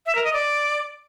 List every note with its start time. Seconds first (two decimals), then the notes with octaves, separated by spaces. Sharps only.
0.06 E5
0.15 A#4
0.24 D#5
0.33 D5